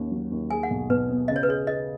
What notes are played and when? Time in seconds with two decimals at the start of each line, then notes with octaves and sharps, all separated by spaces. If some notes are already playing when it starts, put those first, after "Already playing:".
Already playing: D#2 C#4
0.12 F#3
0.32 D#2
0.50 G#4 G#5
0.63 F#5
0.70 B1
0.90 B2 B4
1.09 B3
1.28 C#3 D#5
1.36 C#5
1.43 B4
1.48 G#4 C#5
1.67 G#4 D#5